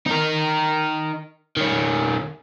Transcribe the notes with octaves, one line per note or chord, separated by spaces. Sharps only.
D#4 A#4
D#3 C#4